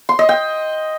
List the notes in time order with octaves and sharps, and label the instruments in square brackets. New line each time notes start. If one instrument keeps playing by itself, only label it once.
[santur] C6
D#5
G5